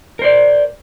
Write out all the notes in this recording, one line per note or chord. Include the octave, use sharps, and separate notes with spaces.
A#4 C5 D5